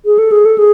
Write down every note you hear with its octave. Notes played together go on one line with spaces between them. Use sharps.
G#4
A4
G#4
A4
G#4